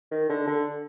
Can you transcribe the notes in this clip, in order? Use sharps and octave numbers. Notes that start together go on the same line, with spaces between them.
D#3
D3
D3